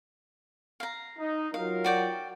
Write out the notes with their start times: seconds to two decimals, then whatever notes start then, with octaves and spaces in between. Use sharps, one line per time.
0.80 F5 A#5
1.19 D#4
1.54 F#3 F4 A#4 F5
1.84 F#4 D5 G5